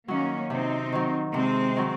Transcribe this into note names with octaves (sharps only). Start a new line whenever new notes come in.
D#3 F#3 A#3 C#4
C3 C4 D#4
D#3 F#3
C3 G#3 C4
D#3 F#3